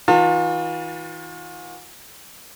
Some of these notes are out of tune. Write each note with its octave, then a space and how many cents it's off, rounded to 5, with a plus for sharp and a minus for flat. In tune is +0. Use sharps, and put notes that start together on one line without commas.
E3 -40 F4 +40 A5 +40